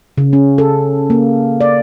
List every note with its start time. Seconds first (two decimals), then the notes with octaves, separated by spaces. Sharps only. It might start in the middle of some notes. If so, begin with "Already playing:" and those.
0.18 C#3
0.33 C#4
0.58 A4
1.10 A#3
1.61 D5